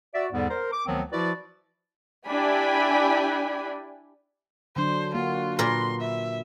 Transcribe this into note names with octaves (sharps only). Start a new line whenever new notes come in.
F#4 D5 E5
E2 G#2 D3 G3 B3
A#4 C5
D6
D2 D#3 F3 F#3 B3 C4
F3 E4 F#4 B4 D5
D4 E4 G4 G5 G#5 B5
D3 F#3 D4 C5
A#3 F4 F#4
A#2 A#4 B4 C6
E5